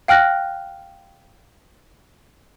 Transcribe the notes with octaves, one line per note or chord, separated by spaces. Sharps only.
F5 G5 F6 F#6 A#6